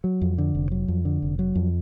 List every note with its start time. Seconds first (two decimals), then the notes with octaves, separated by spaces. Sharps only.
0.04 F#3
0.21 F2
0.38 D3
0.55 F1
0.71 F#3
0.88 F2
1.05 D3
1.22 F1
1.39 F#3
1.55 F2